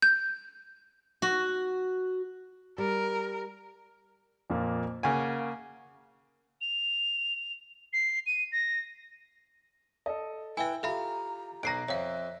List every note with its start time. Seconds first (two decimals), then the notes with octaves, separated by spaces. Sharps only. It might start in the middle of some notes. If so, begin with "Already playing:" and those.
0.02 G6
1.22 F#4
2.78 G3 A#4
4.50 F2 A#2 A#3
5.03 C#3 A#3 F#5 G#5
6.61 F7
7.93 C7
8.26 D#7
8.52 A#6
10.06 A4 D#5
10.57 E4 B4 E5 G5 G#5
10.83 F4 G4 A4 E5 F5 A#5 B5
11.63 B1 A#5 F#6 A#6 C7 D7
11.88 F2 C#5 E5 F5